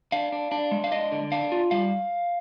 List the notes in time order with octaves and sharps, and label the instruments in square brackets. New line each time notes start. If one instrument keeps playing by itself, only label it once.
[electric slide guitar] D4 F5
D4
D4
G#3
F5
D4 D#5
D3
D4 F5
F4
G3 F5